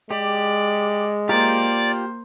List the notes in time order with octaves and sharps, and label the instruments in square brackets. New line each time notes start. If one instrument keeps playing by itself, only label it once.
[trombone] G#3 [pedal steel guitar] G4 [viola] D5
[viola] A#3 C5 [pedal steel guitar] F4 G4 A#5 [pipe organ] D5 A6